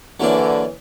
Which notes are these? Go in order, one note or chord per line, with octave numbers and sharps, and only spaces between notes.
D3 E3 F#3 A#3 D4